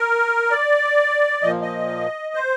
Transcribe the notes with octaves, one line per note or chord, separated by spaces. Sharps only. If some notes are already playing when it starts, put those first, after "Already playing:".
Already playing: A#4
D5
A#2 F3 D#5
D#5
C5